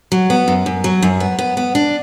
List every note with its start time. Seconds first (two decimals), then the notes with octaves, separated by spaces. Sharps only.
0.12 F#3
0.30 B3
0.48 F#2
0.66 F#2
0.84 F#3
1.02 F#2
1.20 B3
1.39 B3
1.57 B3
1.75 D4